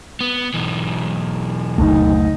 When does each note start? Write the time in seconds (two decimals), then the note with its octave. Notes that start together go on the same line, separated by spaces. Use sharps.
0.21 B3
0.54 B1 E3
1.78 F#1 D2 A3 D#4